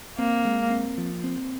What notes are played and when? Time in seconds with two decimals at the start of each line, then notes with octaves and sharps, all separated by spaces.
0.18 A#3 C4
0.45 G#3
0.70 C4
0.98 F3
1.24 C4